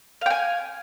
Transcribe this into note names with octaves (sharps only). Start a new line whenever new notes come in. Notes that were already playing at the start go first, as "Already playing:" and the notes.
F5 G5 G#5